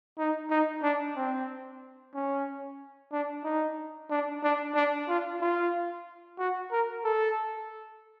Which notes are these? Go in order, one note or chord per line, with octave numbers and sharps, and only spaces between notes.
D#4
D#4
D4
C4
C#4
D4
D#4
D4
D4
D4
F4
F4
F#4
A#4
A4